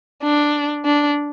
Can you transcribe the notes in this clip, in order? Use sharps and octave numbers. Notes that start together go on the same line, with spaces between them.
D4
D4